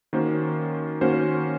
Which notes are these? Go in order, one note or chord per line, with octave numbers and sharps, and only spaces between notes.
D#3 A#3 C#4 F#4 C5
D#3 A#3 C#4 F#4 C5